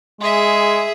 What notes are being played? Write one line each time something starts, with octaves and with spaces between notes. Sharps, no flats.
G#3 G#4 E5